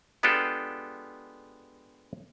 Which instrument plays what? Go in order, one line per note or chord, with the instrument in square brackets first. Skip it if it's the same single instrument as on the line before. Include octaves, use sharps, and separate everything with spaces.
[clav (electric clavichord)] G#3 B3 D4 F4 G4 A4